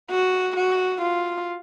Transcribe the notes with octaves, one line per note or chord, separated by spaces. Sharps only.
F#4
F#4
F4